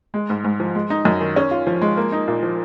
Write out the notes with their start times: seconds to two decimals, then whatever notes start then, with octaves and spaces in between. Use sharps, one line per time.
0.14 G#3
0.30 G#2
0.44 G#2
0.60 F3
0.75 G#3
0.90 D#4
1.05 F#2
1.21 D#3
1.36 C#4
1.51 F4
1.67 F3
1.81 G#3
1.97 A#3
2.12 D#4
2.28 A#2
2.43 F3